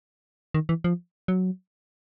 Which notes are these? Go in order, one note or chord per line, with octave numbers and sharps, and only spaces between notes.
D#3
E3
F3
F#3